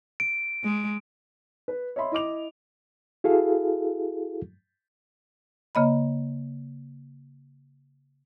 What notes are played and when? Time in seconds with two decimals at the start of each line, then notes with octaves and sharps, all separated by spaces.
0.20 D7
0.64 G#3
1.68 B4
1.96 C#5 D#5 E5 B5 C6
2.12 E4 D#5 D6 F7
3.24 E4 F#4 G#4 A4 F5
5.75 C#3 A#3 D#5 B5